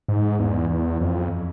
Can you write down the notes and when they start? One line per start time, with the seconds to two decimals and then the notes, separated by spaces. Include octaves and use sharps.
0.08 G#2
0.39 E2
0.70 E2
1.01 F2